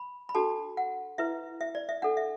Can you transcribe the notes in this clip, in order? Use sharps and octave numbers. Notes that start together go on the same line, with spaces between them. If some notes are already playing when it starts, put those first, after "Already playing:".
Already playing: B5
B5
D4 F#4 A4 A5
F#5
E4 B4 E5
E5
D5
E5
D4 A4 F#5
E5